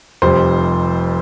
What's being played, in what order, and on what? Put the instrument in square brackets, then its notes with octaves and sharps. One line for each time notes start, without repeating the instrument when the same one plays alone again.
[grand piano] F1 F2 C3 G3 C5